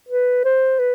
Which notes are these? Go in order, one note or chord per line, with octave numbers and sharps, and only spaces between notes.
B4
C5
B4